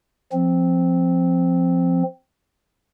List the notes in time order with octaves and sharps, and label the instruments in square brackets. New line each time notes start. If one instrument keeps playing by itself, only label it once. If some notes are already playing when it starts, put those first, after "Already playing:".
[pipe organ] F3 C4